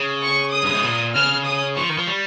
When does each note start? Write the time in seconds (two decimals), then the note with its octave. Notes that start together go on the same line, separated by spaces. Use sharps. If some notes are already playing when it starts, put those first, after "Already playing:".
Already playing: C#3
0.23 C#6
0.53 D#6
0.63 G2
0.73 G#2
0.84 A#2
1.15 C#3 F6
1.46 D#6
1.77 F3 C#6
1.90 D#3
1.98 F3
2.08 G3